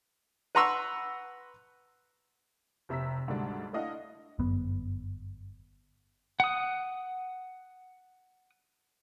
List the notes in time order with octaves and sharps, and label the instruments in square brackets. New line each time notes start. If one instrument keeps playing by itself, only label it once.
[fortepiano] B4 F#5 A#5 C6 C#6 E6
[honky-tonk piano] F1 C3 E5 A#5 E6 B6
D2 G#2 D3 G3 D4
A3 D4 E4 D#5 F5 F#5
[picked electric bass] G1 F#2 B3
[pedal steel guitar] F#5 D#6